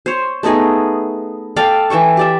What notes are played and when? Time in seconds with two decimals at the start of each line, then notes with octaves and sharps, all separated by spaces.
0.06 C5 C#5
0.43 A3 B3 D#4 G#4
1.56 A4 D5 F5 G5
1.90 E3 E5 G5 C#6
2.17 G4 D5 E5